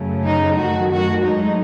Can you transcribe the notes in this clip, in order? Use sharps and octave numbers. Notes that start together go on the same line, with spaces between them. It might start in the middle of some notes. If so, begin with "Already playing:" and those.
Already playing: F#2 C#3 F#3 A3
D#4
F#2 D#3 A3 F#4
F#4
G#2 F#3 A3 D#4